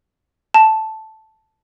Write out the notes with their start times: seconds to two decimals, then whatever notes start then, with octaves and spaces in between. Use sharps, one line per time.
0.54 A5